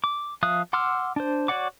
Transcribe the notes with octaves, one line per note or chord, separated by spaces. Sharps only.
D6
F3 E5 F5 D#6 F#6
F#5 C6 D6 E6 F6
D4 C5
F#4 C#5 D5 F#5 D6